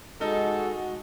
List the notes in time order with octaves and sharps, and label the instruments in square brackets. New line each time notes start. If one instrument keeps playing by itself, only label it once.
[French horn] G#3 [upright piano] D#4 [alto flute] F#4 [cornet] A4